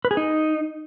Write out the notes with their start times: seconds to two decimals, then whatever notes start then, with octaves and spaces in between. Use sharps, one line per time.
0.05 B4
0.11 G#4
0.17 D#4